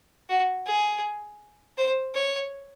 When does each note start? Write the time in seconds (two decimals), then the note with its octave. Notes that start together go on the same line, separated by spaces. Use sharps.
0.29 F#4
0.66 G#4
1.78 C5
2.15 C#5